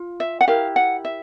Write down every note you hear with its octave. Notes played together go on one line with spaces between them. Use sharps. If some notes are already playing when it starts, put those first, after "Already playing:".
Already playing: F4
E5
F#5
E4 G4 A#4 F5
F#5
E5